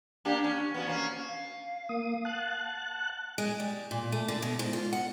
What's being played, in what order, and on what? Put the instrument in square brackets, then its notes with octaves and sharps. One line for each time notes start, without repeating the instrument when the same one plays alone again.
[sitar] A#3 D4 G4
C#4
B3 C#4 F#4
A#3 C#4
[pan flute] F5
[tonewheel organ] A#3 D#6
F#5 A5 F#6
[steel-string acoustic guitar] G#3
G3
A#2
A3
D3
B2
G#2
F4
F#5